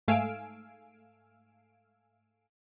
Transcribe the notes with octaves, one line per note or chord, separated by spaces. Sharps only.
G#2 A3 F5 G#5 E6 D7